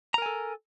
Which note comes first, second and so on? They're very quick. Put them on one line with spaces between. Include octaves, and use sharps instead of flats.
A#5 A#4 G#5 A4